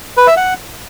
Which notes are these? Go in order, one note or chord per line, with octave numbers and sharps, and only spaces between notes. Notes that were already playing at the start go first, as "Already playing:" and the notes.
B4
E5
F#5